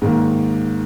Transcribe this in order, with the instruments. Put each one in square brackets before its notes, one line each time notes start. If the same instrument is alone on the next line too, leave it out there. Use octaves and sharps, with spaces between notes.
[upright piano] G#2 D#3 A#3